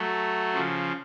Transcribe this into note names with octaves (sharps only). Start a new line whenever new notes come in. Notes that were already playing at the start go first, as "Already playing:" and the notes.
Already playing: F#3 A3
C#3 F3